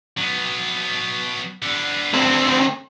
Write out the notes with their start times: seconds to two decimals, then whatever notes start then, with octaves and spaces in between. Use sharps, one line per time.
0.17 F#3 B3
1.62 D3 B3
2.14 D2 C4